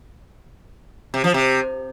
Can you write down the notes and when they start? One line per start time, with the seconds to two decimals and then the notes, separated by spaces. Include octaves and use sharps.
1.14 C3
1.24 F3
1.34 C3